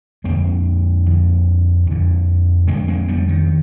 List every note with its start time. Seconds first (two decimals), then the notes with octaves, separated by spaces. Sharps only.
0.24 F2 D3 G#3 C4
1.06 F2 D3
1.87 F2 D3
2.68 D3 G#3 C4
2.71 F2
2.88 G#3 C4
3.08 G3 B3
3.28 D#3